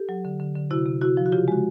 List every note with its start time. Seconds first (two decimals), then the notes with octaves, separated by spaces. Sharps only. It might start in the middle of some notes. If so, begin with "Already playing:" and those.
Already playing: G4 A4
0.09 F#3
0.25 D3
0.40 D3
0.55 D3
0.71 C3 E4 F#4
0.86 C3
1.01 C3 E4 F#4
1.17 F3
1.26 F#4
1.32 C#3 F4 G4
1.48 G#3 F#4